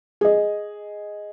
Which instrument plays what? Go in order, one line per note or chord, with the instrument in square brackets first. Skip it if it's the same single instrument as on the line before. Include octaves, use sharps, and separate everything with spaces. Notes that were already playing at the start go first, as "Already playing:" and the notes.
[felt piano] G#4 D#5